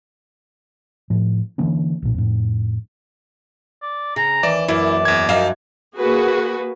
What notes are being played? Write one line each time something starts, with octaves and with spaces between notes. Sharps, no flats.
A2 F3
D3 E3 A#3 C#4
B1 A#2
F2 A2
D5
C#3 A#5
D#2 E3 D5
F#2 A#3 E4 D5
E2 G#6
F#2 F3 D#4 E5 F5
A#3 F#4 G#4 B4